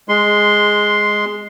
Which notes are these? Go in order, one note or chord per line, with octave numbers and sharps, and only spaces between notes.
G#3 C6